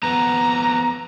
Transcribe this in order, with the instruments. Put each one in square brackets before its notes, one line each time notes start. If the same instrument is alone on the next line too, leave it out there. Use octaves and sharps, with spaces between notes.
[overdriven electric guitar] F2 B3 [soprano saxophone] A#5